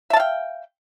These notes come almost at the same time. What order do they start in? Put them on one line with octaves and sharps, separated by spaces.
E5 A5 F5 G5